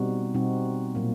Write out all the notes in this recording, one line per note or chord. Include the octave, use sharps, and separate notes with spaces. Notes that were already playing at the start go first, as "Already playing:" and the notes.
Already playing: B2 G3 C4 D#4 F#4
B2 G3 C4 D#4 F#4
A#2 F#3 A#3